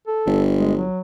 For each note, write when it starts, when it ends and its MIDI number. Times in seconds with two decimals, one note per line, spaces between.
0.07 0.40 69
0.26 0.84 31
0.58 0.72 56
0.77 1.01 54